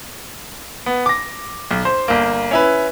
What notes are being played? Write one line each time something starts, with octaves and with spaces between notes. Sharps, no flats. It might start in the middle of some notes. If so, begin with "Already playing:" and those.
B3
D6 A#6
B1
C5
G1 A#3
C#4 E4 B4